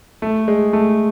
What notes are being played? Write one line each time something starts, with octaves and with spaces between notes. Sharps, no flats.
A3
G#3
A3